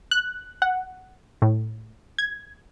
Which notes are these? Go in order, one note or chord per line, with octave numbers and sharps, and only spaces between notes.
F#6
F#5
A2
G#6